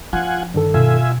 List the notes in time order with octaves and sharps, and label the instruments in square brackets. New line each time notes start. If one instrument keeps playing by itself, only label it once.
[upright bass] F3 D4 [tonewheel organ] F4 F#5 G#5
[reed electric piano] G2 D#3 A4 [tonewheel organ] D3
[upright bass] B2 [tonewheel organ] F4 E5 G#5